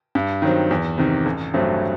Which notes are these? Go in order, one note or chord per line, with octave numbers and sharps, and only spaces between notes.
G2
D#3 F#3 C4
E2
C3 D#3
A1
G2 F#3 A3 C4